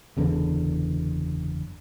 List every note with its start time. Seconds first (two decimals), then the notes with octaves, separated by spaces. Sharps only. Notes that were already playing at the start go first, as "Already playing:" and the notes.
0.17 F#1 E2 D3